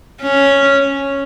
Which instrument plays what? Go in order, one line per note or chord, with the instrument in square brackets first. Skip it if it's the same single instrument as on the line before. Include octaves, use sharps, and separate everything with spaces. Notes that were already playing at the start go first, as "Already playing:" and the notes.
[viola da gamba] C#4